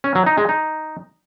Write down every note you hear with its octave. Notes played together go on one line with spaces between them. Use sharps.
C#4
F#3
D#4
G#3
D#4